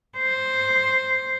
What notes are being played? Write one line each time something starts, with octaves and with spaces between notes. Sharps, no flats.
C5